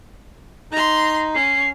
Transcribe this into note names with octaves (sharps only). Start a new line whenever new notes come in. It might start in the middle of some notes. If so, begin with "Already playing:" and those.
D#4 A#5 C6
C#4 C7